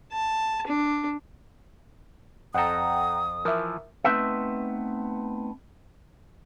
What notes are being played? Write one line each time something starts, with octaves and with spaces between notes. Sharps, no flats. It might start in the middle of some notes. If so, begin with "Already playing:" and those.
A5
D4
F2 A4 F#5 G5 A#5 D#6
E3 F3 A#4 E5
A3 B3 C4 D#4 B4 E5